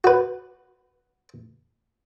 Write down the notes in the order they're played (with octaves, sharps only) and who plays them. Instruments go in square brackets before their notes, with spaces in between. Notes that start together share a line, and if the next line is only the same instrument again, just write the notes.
[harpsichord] F#4 B4